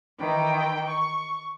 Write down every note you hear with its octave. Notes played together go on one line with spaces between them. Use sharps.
D#3 E3 G5
C#6